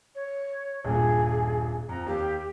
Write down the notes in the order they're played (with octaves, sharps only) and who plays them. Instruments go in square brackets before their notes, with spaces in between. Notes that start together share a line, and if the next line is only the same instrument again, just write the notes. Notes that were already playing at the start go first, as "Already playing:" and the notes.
[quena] C#5
[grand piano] D#1 G2 A#2 [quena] G#4
[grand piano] F2 [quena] A#5
[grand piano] D#2 F5 [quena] G4